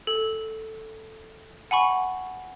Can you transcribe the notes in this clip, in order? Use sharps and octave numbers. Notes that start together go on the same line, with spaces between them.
A4
F#5 G#5 B5 C#6